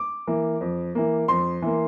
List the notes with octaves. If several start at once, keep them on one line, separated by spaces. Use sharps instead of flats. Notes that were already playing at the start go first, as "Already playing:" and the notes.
Already playing: D6
E3 A#3
F2
E3 A#3
F2 C6
E3 A#3